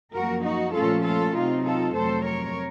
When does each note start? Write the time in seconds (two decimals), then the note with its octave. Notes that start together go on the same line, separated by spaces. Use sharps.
0.14 F#2 F3 A#3 F#4 A#4
0.44 D#4 F#4
0.75 A#2 F3 A3 C#4 F4 A4
1.05 F4 A4
1.36 C3 F#3 C4 D#4 F4
1.66 F4 A4
1.95 F2 C3 F#3 A3 C4 A4 C5
2.26 A#4 C#5